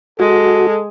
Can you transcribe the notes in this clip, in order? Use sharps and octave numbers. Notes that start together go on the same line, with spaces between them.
G#3 F#4 A4